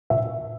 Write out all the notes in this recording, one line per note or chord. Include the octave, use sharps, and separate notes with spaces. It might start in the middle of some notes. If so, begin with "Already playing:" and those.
A#2 E5